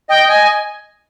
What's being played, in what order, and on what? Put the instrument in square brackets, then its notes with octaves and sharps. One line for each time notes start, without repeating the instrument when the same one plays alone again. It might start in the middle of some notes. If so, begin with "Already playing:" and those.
[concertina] D#5 [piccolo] G5
[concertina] D#5 [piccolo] G#5